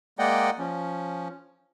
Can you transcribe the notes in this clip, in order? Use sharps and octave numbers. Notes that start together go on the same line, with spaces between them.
G#3 A#3 D5 D#5 F#5 G5
F3 C#4